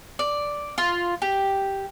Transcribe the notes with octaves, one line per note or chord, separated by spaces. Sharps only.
D5
F4
G4